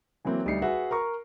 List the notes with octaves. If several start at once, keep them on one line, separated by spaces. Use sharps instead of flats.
E3 F#3 A#3 C4
D2 G3 D#4 C7 C#7
F#4 G#4 B4 E5 F#5
A#4 A#5 C#6